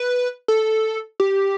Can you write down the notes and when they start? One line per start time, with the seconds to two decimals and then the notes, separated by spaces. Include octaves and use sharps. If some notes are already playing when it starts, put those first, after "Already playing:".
Already playing: B4
0.48 A4
1.20 G4